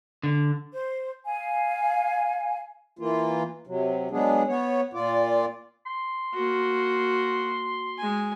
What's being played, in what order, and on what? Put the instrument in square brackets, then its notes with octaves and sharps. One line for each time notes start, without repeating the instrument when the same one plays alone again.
[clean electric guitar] D3
[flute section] C5
F5 G#5
[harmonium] E3 A#3 F4
C3 F#3
F#3 G#3 B3 D4 G#4
B3 C#5
A#2 F4 D5
[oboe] C6
[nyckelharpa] A#3 F#4
G#3 G#5